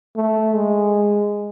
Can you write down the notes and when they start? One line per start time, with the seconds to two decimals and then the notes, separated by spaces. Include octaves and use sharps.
0.16 A3
0.55 G#3